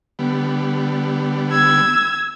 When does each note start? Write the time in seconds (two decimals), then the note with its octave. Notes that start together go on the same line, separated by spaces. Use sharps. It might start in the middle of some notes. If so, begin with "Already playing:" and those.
0.19 D3 G3 B3
1.51 E6 G#6